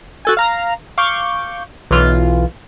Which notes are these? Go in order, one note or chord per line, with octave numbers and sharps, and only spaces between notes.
F#4 A4 G#5
F5 A#5 F6
F5 C#6 D6 G6
B1 E3 F4